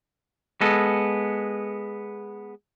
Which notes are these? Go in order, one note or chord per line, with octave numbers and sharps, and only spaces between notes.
G#3 B3 A4